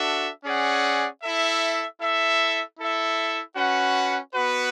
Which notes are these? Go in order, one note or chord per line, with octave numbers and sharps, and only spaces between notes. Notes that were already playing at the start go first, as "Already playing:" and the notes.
Already playing: D4 F#4 A4 E5
C#4 G#4 D5 F#5
E4 A4 E5
E4 A4 E5
E4 A4 E5
C#4 F#4 B4 F#5
B3 F#4 B4